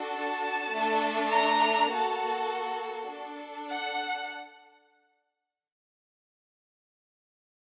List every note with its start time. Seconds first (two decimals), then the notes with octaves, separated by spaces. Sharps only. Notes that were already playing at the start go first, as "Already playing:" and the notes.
Already playing: D4 F#4 A4
0.14 A5
0.73 A3 D4 A4
1.32 A#5
1.91 A#3 F#4 A4 A5
3.09 D4 A4
3.68 F#5